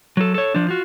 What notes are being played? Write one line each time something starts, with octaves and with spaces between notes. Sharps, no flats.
F#3 A4
A4 C#5
F3 D4
F4 F#4